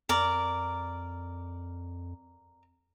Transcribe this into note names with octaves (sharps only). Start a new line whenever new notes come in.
F2 A#4 D5